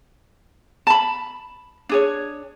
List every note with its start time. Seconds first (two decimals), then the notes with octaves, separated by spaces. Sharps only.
0.87 A5 B5
1.89 D4 G#4 C#5